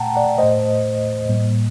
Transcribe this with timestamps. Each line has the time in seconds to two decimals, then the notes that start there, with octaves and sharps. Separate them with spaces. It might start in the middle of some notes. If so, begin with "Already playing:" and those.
Already playing: A#2 A3 F#5 G5 A5 A#5
0.16 D5 F#5
0.38 A2 A3 C5 D#5
1.29 A2 G3 A#3